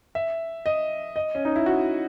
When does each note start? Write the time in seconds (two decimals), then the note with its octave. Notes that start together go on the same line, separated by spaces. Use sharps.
0.15 E5
0.66 D#5
1.16 D#5
1.35 C#4
1.45 D#4
1.56 E4
1.66 F#4